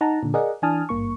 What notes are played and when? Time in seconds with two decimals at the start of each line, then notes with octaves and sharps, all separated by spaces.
0.01 D#4 F#5 A5 A#5
0.23 A#2 D3
0.34 G#4 A#4 D5 D#5 F#5
0.62 E3 D4 G#5 A5 D#6 F6
0.89 G#1 G2 A#3 C#6